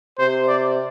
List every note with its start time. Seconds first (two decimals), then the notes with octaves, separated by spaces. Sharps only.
0.19 C3 C5
0.48 D5